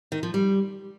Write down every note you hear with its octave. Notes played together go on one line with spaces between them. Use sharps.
D#3
F3
G3